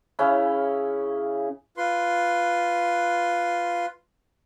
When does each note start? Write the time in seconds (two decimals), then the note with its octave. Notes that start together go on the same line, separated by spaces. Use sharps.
0.19 C#3 C#4 E4
1.77 F4 B4 C6